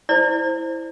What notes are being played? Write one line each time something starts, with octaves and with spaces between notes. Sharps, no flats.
E4 C5 D5